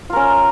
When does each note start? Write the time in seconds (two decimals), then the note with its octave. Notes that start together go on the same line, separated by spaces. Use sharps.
0.10 F4
0.13 A#4
0.16 C#4